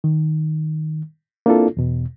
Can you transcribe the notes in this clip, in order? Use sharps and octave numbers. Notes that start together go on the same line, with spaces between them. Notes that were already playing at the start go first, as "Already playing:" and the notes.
D#3
A#3 C4 D4 E4 F4 A4
E2 B2